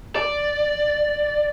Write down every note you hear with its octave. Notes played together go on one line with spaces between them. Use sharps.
D5